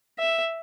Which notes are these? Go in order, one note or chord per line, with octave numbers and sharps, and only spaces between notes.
E5